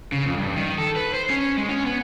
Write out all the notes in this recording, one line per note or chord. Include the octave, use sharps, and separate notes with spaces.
C#3
F2
G2
D#3
A4
B4
C5
C#4
G#3
C#4
B3